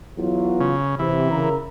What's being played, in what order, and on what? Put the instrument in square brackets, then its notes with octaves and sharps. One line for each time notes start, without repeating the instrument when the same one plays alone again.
[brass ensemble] E2 F#3 F4
[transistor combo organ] C#3
[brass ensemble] C3 [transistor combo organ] E3
[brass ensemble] C#3 A#4 A#5